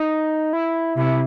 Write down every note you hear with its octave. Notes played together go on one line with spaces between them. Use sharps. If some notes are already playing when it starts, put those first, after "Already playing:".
Already playing: D#4
E4
C3 E4